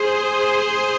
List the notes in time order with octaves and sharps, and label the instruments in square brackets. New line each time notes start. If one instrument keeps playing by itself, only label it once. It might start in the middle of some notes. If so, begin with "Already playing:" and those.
Already playing: [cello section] G#4 C5